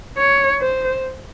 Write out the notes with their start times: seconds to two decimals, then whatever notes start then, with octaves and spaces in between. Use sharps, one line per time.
0.18 C#5
0.61 C5